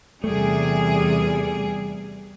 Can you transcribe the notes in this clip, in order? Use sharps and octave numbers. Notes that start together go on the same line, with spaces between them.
E2 C3 G3 A3 G#4